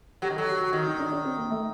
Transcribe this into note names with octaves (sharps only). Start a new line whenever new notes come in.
F#3 G4
D#3
F#3 A4
G4
F#4
D#3 F#4
D#4
D4
D4
C4
A#3
A3